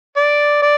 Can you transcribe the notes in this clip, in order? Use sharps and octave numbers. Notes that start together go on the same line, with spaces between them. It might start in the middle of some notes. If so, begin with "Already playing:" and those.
D5
D5